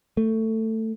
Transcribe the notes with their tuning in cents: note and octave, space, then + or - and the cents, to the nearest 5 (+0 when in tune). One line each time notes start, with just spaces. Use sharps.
A3 +15